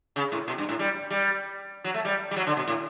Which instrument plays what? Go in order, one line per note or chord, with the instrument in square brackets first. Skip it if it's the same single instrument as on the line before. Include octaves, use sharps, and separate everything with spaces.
[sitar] C#3
A2
B2
G2
A2
G3
G3
F#3
A3
G3
G3
F#3
D3
B2
A2